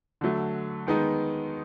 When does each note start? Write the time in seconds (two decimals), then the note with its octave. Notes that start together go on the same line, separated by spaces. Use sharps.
0.21 D3 F#3 A3
0.87 D#3 G#3 B3 D#4